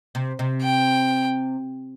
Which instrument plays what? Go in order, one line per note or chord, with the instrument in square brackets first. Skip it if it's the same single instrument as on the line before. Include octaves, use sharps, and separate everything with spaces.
[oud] C3
C3
[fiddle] G5